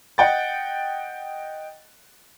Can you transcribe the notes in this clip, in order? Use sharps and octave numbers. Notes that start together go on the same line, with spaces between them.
D#5 F#5 G5 A6